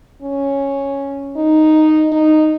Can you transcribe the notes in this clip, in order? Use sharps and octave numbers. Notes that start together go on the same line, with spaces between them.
C#4
D#4
D#4